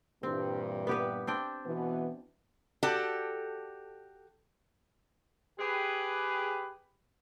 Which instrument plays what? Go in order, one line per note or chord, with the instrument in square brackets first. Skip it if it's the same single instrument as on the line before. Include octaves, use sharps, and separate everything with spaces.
[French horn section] G2 A#2 E3 [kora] C4
[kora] B3 G4 B4
C4 D4 G5
[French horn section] B2 E3 B3
[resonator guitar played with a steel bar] F#4 G4 A4 D5
[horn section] G4 G#4 B4